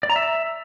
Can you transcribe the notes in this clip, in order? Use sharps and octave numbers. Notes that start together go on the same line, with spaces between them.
D5
A#5
E5